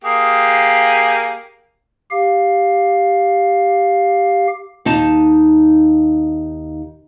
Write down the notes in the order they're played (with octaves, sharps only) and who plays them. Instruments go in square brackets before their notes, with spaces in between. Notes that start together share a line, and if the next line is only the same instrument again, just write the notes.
[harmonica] A#3 G4 G#4
[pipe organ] G4 F5
[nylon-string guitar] D#2 D#4 A5